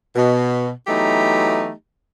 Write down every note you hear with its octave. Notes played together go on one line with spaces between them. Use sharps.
B2
E3 F#3 A3 B3 D#4 G4